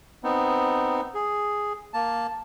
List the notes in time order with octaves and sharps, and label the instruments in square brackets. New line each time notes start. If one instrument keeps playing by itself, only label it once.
[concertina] B3 C4 D#4
G#4
A#3 A5